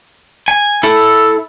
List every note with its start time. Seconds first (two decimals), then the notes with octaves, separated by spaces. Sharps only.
0.48 G#5
0.83 E4 A4